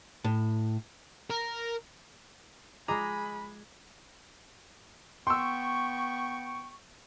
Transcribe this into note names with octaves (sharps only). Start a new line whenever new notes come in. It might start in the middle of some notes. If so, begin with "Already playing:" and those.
A2
A#4
G#3 F4 G#4 D#5 A#5 B5 D6
B3 G5 C6 C#6 E6